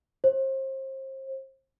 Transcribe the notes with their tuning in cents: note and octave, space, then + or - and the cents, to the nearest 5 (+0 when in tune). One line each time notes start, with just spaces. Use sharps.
C5 +35